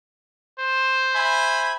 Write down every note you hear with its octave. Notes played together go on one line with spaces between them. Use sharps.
C5
E5 G#5 B5